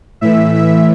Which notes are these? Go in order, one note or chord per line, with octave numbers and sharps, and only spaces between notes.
A2 E3 E5
E5